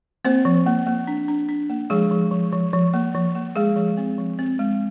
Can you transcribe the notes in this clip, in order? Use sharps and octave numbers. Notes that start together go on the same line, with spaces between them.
A#3 C4 C5
F3
A#3
A#3
D4
D4
D4
A#3
F3 G#3 G#4
F3
F3
F3
F3
A#3
F3
A#3
G#3 G#4
F3
C4
F3
C4
G#3